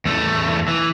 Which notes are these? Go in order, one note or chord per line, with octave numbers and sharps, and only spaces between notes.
E2 A3
E3